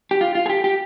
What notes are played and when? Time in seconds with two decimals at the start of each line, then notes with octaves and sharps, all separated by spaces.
0.11 G4
0.21 F4
0.35 F4
0.46 G#4
0.50 G4
0.64 G4